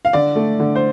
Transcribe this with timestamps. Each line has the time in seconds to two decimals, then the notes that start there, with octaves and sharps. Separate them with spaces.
0.05 F5
0.13 D3 D5
0.36 A3
0.60 D3
0.76 C5